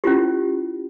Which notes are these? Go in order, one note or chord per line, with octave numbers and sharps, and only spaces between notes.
C#4 E4 F4 G4